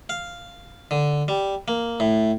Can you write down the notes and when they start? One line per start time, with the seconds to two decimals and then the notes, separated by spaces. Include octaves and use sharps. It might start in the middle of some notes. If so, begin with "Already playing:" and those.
0.09 F5
0.91 D3
1.28 G3
1.68 A#3
2.00 A2